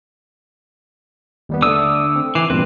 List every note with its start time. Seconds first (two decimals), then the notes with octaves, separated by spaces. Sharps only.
1.49 D#2 G3 B3
1.62 D3 A3 D4 D#6 E6
2.16 C4
2.35 E3 D6 C7
2.50 E2 G2 A#2 C4 B4